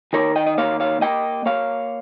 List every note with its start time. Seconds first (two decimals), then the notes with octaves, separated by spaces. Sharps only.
0.13 D#3 A#4 C#5
0.36 D#5 G5
0.46 D#5
0.58 A#3 C#5 F5
0.80 C#5 F5
1.01 A#3 D#5 G5
1.46 A#3 C#5 F5